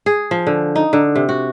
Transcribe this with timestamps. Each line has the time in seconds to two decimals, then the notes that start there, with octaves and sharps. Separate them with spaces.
0.06 G#4
0.31 F3
0.47 D3
0.76 D#4
0.93 D3
1.16 C3
1.29 F#4